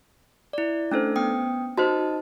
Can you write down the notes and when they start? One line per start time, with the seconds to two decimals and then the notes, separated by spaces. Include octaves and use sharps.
0.53 E4 D5
0.91 A3 C#4 D4 A4 C5
1.16 B3 G5 D#6
1.78 D#4 F#4 A#4 C5 D#5 A5